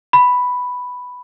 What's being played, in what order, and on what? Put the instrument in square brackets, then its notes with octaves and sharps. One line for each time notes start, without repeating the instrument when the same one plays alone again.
[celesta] B5